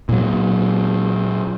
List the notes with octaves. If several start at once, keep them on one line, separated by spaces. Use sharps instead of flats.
A#2 F#3